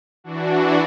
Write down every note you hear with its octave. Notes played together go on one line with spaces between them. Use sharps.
E3 D4 F#4